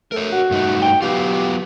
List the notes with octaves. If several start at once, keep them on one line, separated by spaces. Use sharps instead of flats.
A3 A#4 C#5
F#4
G2 A3 D#4
G5
F#3 B3 F4 G4